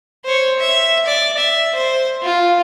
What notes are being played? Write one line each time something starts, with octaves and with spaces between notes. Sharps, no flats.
C5 C#5
E5
D5
E5
C5
F4